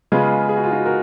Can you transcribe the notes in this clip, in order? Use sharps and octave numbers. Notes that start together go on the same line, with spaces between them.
C#3 G#3 B3 F4 G#4
G#4
F#4
F4
D#4 F#4
F#4 A#4